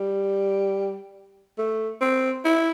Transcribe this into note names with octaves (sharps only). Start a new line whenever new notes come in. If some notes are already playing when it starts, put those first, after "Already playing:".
Already playing: G3
A3
C4
E4